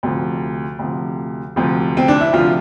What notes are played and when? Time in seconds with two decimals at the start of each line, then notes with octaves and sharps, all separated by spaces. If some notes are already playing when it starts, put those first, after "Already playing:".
0.03 D2 C3 F3
0.79 D2 C3 F3
1.56 D2 C3 F3
1.97 C4
2.08 D4
2.21 E4
2.33 D2 C3 F3 F4